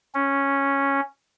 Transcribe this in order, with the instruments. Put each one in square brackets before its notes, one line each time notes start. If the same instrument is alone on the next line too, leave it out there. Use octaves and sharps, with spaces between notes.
[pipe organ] C#4